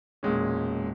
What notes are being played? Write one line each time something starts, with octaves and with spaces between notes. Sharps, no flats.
E1 A#2 G#3 C#4